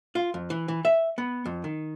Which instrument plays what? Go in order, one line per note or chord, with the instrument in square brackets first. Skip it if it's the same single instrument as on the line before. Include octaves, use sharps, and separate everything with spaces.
[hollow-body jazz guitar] F4
F2
E3
E3
E5
B3
F2
D#3